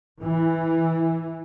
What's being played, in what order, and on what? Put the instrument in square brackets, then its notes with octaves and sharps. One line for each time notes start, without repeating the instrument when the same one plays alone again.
[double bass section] E3